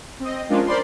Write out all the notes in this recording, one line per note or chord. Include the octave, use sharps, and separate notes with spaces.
C4 D#5
F3 G#3 A#3 C#4 D4 F4
A#4 C5 D5 B5 C6